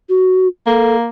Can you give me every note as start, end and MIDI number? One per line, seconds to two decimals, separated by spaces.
0.09 0.48 66
0.67 1.09 58
0.67 0.96 69